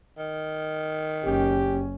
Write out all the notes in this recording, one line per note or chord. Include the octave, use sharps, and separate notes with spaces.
D#3
F#1 C#4 G4